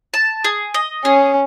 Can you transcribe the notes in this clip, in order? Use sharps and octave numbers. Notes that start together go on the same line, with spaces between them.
A5
G#4
D#5
C#4 G#4